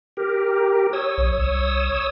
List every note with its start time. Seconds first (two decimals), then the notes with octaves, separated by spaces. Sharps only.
0.17 G4 A#4
0.93 C#5 D#6 E6
1.18 B1
1.39 C2